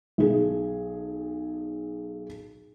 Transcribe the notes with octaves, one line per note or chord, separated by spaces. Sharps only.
B1 G#4